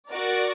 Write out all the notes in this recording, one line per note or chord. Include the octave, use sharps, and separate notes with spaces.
F#4 A#4 D5